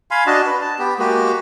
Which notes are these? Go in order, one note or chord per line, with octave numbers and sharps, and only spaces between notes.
F5 G#5 B5 C6
D4 F#4 D#5 A5
B4
A5
B3 G4
G#3 A#3 F#4 G4